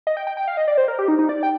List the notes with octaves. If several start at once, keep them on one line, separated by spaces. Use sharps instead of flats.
D#5
G5
G5
G5
F5
D#5
D5
C5
A#4
G4
D#4
D#4
D5
G5